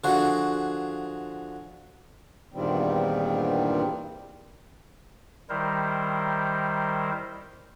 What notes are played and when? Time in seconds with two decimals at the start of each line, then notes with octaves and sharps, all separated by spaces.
0.04 D3 F3 F#4 G#4
2.54 E2 G2 A#2 D#3 G3 C4
5.50 D#3 G3 E4 A#4 C5